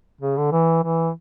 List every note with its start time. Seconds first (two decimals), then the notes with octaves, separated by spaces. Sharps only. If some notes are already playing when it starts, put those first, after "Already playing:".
0.21 C#3
0.37 D3
0.52 E3
0.83 E3